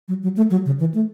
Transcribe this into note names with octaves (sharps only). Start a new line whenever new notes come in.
F#3
F#3
A3
F#3
C#3
E3
A3